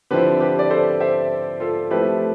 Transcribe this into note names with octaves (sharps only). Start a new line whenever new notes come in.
D3 F3 C4 E4 G4 B4
G4 B4
D5
A4 C5
C5 E5
F4 A4
F3 A3 C4 E4 G4 B4